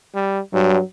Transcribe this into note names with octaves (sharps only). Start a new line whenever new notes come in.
G3
G2 F#3